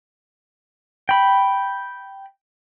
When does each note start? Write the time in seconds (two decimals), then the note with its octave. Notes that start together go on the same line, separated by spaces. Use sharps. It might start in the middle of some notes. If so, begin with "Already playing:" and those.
1.09 G5 B5